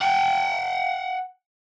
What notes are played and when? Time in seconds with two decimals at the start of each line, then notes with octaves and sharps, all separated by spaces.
0.01 F#5 G5